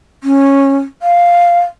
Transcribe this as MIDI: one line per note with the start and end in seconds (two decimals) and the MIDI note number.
0.24 0.76 61
1.02 1.60 77